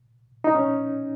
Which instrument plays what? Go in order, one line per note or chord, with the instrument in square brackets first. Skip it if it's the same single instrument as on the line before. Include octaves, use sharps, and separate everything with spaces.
[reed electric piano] D#4
C#4